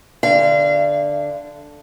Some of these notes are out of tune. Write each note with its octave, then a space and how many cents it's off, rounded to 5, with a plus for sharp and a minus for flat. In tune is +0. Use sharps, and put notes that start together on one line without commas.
D3 +0 F5 -35